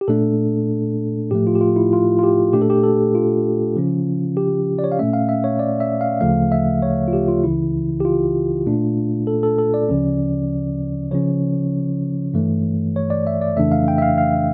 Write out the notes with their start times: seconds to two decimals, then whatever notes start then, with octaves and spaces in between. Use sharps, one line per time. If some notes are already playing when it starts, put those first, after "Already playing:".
0.01 G4
0.08 A#2 A3 D4 A4
1.31 A2 F3 A3 G4
1.47 F4
1.55 G4
1.61 F4
1.76 E4
1.93 F4
2.19 F4
2.23 G4
2.53 A#2 A3 D4 G4
2.62 A4
2.70 G4
2.84 A4
3.15 F4
3.77 C#3 F3 C#4
4.37 G4
4.79 D5
4.84 C#5
4.92 F5
4.99 A#2 A3 C#4 E5
5.13 F5
5.29 E5
5.44 C#5
5.59 D5
5.80 E5
6.01 F5
6.21 D2 C#3 F3 A3 F5
6.52 E5
6.82 C#5
7.08 F4
7.13 G4
7.28 F4
7.43 C#2 C#3 E3 E4
8.00 G4
8.05 F4
8.66 A#2 A3 D4
9.27 A4
9.43 A4
9.59 A4
9.74 D5
9.89 D2 C#3 F3 C#4
11.11 C#3 F3 C#4 C#5
12.34 G2 E3 A3
12.96 C#5
13.10 D5
13.27 E5
13.41 D5
13.56 F2 C#3 E3 A3 D4 E5
13.72 F5
13.88 G5
13.98 E5
14.02 F5
14.18 F5